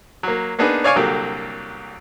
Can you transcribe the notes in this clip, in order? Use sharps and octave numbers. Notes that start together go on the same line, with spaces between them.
F#3 A#3
A#3 B3 D4 D#4 G#4 B4
C#5 D5 F5 G#5 C#6
C2 D3 F#3 A#3 G4